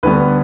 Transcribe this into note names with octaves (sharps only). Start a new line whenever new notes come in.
D2 D3 G3 B3 B4